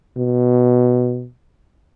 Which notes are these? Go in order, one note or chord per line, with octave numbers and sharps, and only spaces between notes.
B2